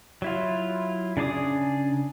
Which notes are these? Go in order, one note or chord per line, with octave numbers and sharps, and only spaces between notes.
F#3 E4 F4
C#3 D4 G#4 D6 D#6